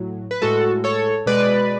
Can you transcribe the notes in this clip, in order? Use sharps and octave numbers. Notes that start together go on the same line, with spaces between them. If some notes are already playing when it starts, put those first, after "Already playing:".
Already playing: A2 F#3
B4
A2 G#3 F#4 A4
A4 C#5
B2 G#3 B4 D5